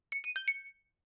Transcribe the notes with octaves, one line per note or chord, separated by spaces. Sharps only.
C#7
D#7
G6
C#7